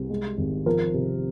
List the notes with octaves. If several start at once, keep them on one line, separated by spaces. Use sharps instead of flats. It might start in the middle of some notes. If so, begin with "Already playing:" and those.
Already playing: C2
G#3
G#1
F3 A#4
C3